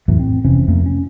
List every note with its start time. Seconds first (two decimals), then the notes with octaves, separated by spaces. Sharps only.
0.08 F2 A2 E3 F#3
0.19 C4
0.45 F1 C3 E3 C#4
0.68 F2 A3 A#3
0.86 C#4